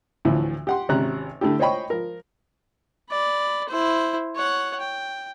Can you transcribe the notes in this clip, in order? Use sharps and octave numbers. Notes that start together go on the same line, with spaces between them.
D2 A2 E3 F3
G4 F#5 C6
G#1 C3 C#4 A#5 F#6
D3 A3 E4 G4
C5 C#5 D#5 G5 B5 C#6
F3 A#4
D5 B5
E4 C5
C#5 F#5
G5